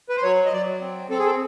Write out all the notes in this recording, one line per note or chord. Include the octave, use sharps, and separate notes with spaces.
B4
C5
F#3 C#5
D#5
F#3 D5
C4
C4 A4
G#4
A4